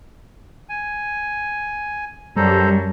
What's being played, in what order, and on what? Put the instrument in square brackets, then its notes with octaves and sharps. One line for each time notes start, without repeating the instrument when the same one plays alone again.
[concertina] G#5
[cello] F#2 [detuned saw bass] G3 [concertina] A4 C5 A#5